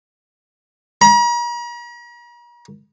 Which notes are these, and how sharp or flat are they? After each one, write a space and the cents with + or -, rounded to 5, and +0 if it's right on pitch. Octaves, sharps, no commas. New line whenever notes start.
A#5 +45